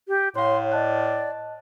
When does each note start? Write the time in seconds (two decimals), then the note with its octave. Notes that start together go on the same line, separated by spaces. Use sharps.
0.08 G4
0.35 A2 C#5 F5 C6
0.72 D5 D#5 A5 F#6